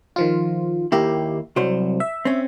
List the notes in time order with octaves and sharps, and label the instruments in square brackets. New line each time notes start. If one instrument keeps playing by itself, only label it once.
[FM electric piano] D#3 F3 F4
[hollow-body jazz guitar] D#2 A#3 E4 [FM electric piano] G4
[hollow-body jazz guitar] C2 C5 [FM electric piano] F#3
[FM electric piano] E5
[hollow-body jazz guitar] C4 C#4